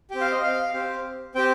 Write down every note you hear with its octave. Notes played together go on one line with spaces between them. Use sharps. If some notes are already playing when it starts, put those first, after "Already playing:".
C4 G4 G5
F5
D#5
F5
C4 G4
C4 G4 G5